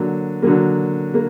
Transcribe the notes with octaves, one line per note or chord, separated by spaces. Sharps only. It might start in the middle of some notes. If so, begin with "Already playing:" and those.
Already playing: D3 F#3 A#3
D3 F#3 A#3
A#3